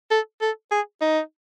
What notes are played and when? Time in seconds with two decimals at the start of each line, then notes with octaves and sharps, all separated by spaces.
0.11 A4
0.42 A4
0.71 G#4
1.01 D#4